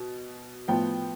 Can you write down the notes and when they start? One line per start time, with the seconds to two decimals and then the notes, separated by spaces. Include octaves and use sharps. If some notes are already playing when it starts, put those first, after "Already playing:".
Already playing: B2
0.68 A2 F3 B3 G5